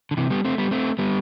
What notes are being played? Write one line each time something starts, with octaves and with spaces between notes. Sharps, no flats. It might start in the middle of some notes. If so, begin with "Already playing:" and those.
D3
C3 E3
G3 B3
A3 C4
G3 B3
A3 C4
G3 B3